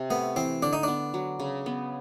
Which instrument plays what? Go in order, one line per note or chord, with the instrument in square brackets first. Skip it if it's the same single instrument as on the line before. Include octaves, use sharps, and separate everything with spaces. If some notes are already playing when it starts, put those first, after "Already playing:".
Already playing: [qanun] C3
[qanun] A3 [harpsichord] B3
[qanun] E3 [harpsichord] C4
[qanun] D3 [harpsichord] D4
[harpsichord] D#4
[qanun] B3 [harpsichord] D4
[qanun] F#3
C#3
B3